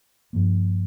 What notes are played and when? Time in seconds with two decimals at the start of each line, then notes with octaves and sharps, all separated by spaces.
0.33 G2 F3 A#3